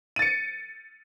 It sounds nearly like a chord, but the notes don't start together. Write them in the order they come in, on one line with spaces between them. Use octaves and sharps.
D#7 A6 C#7